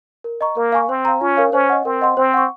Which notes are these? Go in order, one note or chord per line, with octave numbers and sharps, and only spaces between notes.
A#4
D#5 A#5 C#6
A#3 A#4
F5 G#5 C#6
C4 C5
F5 A#5
C#4 F4
A#4 C#5 F5
C#4 C5
D#5 F#5
C4 A#4
D#5 F#5 C6
C4 C5
F#5 C#6